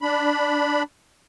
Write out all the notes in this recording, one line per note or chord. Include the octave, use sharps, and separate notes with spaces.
D4 B5